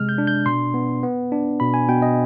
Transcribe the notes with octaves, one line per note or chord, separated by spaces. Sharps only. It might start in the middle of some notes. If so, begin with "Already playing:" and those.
Already playing: C3 G#3 F6
G6
D4
G6
B2 C6
B3
B3
D4
B2 B5
G#5
B2 G5
D#5